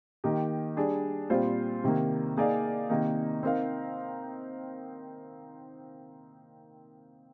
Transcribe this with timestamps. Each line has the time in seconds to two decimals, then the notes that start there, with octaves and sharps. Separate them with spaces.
0.24 D#3 A#3 D#4 G4
0.77 G3 D4 G#4
1.30 A#2 G3 C4 F4 C5
1.84 C3 D#3 A#3
2.37 A#3 D#4 G#4 D5 F5
2.89 C3 D#3 A#3 D#4
3.43 C4 D#4 A#4 F5